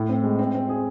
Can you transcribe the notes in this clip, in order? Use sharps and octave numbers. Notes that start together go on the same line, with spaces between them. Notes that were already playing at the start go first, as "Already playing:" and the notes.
Already playing: A2
C4
G#3
C4
C4
G#4